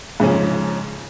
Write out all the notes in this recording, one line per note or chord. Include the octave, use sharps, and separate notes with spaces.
G#2 C#3 F3 C#4